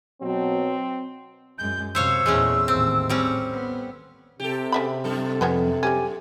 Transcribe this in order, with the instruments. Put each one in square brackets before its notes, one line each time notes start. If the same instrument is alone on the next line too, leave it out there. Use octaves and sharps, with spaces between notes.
[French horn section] B2 F#3 [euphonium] C4
[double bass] F#2 G#3 [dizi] G6
[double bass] F#2 C3 [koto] C5 C#5 F5 [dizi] E6
[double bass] E2 A#2 [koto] G#3 A3 C#4
[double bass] A1 D#2 [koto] C4
[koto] G3 C4 C#4
[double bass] B3
[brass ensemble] C3 [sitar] G4 A4
[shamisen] C#3 E5 B5
[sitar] F#2 A4
[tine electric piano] F2 [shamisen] G#3 B3 C#4
[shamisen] G#3 C#4 [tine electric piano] G4 G#5